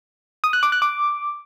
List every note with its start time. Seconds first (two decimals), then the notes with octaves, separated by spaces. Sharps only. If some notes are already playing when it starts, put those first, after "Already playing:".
0.44 D#6
0.53 F#6
0.63 D6
0.72 F#6
0.82 D6